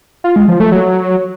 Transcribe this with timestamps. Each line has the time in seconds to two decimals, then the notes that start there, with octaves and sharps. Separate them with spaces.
0.24 F4
0.36 G#3
0.48 F3
0.60 A3
0.72 F#3